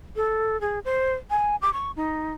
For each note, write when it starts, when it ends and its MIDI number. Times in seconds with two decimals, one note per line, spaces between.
0.16 0.60 69
0.61 0.79 68
0.85 1.13 72
1.30 1.56 80
1.62 1.73 86
1.73 1.91 85
1.96 2.33 63